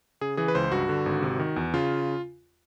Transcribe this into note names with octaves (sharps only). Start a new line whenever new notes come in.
C#3 G#4
E3 G#4
B4
C#2 C5
G2 F#4
D3
G#1
C3
D#3
E2
C#3 F4